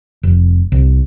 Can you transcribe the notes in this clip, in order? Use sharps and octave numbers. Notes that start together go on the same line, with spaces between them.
F1
C2